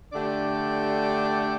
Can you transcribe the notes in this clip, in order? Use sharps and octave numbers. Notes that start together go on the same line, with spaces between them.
D3 A3 D4 G4 D5